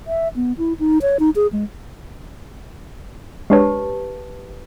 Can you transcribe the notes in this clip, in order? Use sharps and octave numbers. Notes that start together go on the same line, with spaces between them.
E5
B3
E4
D#4
C#5
D#4
G#4
G#3
G#3 D4 G4 B4 C#5 A5